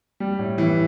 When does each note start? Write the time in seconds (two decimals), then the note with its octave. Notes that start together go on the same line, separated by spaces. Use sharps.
0.20 G3
0.39 A2
0.58 E3